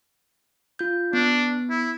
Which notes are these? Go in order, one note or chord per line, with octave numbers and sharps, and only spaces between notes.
F4 G6
B3 D4
E4